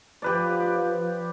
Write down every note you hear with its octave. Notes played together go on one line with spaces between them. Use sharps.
F3 G4 B4 D5